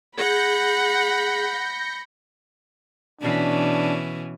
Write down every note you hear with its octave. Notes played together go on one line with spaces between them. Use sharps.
G#4 F#5 B5 G6 A#6 C#7
B2 E3 C#4 D4